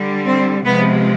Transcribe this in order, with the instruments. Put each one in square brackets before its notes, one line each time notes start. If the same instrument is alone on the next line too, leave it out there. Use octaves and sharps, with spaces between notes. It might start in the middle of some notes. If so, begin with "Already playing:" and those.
Already playing: [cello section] D3 G3
C4
C3 F3 G#3 B3